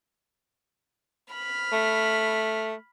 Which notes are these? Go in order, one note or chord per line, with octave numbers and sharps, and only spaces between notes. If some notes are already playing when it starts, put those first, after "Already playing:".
B5 F6
A3